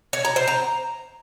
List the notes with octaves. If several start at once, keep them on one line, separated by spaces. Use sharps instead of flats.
C#5
A#5
C5
A#5